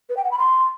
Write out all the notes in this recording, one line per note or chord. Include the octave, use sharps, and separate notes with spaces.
B4
G5
F#5
B5
C6